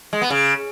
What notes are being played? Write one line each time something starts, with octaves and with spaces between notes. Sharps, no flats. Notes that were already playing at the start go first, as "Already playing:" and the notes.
G#3
B3
C#3